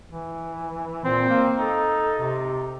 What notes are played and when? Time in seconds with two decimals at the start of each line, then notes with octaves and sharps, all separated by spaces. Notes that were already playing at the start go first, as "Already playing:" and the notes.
0.09 E3
1.05 A#2 C4
1.29 A#3
1.58 D#4 A4
2.19 C3